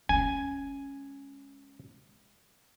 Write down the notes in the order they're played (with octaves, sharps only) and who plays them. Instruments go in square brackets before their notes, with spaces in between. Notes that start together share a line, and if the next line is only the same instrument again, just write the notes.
[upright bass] G#3 C#4 [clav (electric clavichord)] G#5